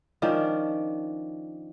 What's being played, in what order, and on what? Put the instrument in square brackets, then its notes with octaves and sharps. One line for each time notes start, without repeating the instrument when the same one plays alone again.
[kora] D#3 F3 C#4 D4